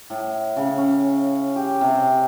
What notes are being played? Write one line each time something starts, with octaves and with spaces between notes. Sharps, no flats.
A2
C#3
C#4
G4
C3